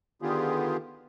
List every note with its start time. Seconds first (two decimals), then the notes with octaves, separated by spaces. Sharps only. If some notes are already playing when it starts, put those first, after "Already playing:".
0.22 D3 D#3 B3 F4 G4 G#4